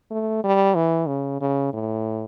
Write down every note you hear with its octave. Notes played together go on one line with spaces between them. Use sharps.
A3
G3
E3
C#3
C#3
A2